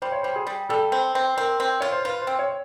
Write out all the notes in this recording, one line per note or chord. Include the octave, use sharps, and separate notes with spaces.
G3 C5
C#5
G3 C5
G#4
G3
G3 A4
C4
C4
C4 A#4
C4
F4 C#5
C5
F4 B4
C5
C4
C#5